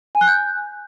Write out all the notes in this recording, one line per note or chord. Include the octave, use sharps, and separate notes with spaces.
G#5
F#6
G6